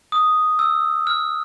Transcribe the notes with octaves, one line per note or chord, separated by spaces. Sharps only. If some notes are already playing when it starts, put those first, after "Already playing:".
D#6
E6
F6